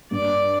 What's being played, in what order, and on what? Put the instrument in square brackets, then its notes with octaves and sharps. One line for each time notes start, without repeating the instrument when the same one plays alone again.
[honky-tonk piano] G2 [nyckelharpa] D5